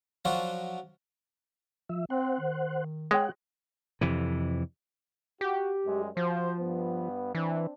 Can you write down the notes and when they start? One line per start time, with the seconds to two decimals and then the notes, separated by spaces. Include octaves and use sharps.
0.25 F3 F#3 D4 F4 F#4
1.89 F3 E5
2.10 C4 C5 F#5
2.40 D#3
3.11 G#3 C#5 F#5 G5
4.01 F2 C3 E3
5.41 F#4 G4
5.85 F#2 G3 G#3
6.17 F3 F#4 C5
6.60 G2 B3
7.35 E3 C4 D4